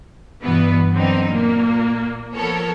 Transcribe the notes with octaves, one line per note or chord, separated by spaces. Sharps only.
G2 B2 E3 B3 B4
D3 F#3 C4 D#4
A#2 A#3
F3 B3 A4 A#4 C#5